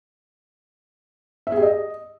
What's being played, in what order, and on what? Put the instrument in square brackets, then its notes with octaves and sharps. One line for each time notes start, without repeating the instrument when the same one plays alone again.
[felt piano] E5
G#4
G4
D#5